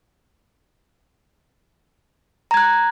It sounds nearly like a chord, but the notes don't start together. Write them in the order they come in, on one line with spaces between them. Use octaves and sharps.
A#5 G#6 F#6